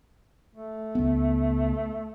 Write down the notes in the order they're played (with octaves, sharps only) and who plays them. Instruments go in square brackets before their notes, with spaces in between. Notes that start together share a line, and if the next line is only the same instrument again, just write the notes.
[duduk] A3
[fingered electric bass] C#2 B3